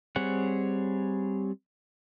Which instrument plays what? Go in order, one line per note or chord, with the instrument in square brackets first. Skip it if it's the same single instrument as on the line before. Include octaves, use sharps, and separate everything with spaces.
[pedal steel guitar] G3 C4 G#4 C#5 F#5